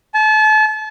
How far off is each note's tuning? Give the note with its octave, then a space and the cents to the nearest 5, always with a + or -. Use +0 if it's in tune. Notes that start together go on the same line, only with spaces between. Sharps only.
A5 -35